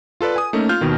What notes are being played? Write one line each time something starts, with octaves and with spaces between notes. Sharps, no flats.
F4 A4 B4 D5
G#5 D#6
A3 A#3 C#4 D#4
F4 F6 G6
D#2 B2 D#3